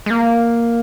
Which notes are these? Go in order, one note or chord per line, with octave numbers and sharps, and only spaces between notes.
G#3
A#3